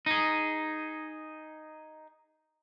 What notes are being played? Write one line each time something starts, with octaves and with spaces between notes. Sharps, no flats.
D#4 G#4